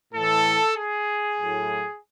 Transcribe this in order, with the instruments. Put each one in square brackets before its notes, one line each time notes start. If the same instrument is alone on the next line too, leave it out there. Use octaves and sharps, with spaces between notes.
[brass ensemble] A2 E3 A4
G#4
A2 F#3